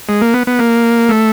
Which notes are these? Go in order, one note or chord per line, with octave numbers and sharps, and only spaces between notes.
G#3
A#3
B3
B3
A#3
A3